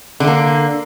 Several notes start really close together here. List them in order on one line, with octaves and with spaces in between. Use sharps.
D3 A3 A#3